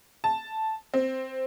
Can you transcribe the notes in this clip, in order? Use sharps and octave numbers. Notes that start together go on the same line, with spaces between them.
A5
C4